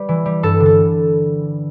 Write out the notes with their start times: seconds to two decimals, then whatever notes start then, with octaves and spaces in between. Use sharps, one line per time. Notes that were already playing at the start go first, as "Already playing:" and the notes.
Already playing: G3 B4
0.09 E3
0.26 G3
0.43 G2 A4
0.60 D3
0.66 A4